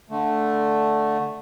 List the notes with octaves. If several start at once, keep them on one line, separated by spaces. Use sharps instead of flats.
D3 A3